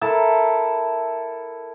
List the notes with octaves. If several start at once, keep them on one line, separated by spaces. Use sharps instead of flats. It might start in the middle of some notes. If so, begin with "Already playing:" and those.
E4 A4 A#4 A5